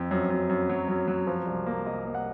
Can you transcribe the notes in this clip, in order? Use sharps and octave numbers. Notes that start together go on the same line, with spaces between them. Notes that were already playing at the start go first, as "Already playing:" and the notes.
Already playing: F2
F#2
F#2
F#2
F#3
F#2
F#3
F3
C2
A#3
C2 D#5
A#3
F#5